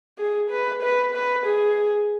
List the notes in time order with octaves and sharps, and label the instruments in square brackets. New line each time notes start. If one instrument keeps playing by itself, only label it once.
[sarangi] G#4
B4
B4
B4
G#4